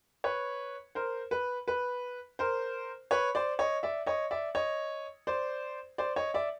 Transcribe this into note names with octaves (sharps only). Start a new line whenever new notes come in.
B4 C#5
A#4 C5
B4
B4
A#4 C5
B4 C#5
C5 D5
C#5 D#5
D5 E5
C#5 D#5
D5 E5
C#5 D#5
C5 D5
C5 D5
C#5 D#5
D5 E5